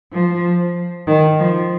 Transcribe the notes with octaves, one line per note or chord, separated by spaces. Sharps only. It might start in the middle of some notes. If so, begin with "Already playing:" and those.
F3
D#3
F3